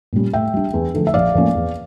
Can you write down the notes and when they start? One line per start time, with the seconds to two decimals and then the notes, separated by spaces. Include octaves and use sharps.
0.13 A#2 G3 C#4
0.33 A2 E5 G5
0.54 G3 D4
0.74 E2
0.94 D3 F3 A3
1.07 E5
1.14 A#1 D5 F5
1.34 A2 F3 A#3 C#4
1.55 E2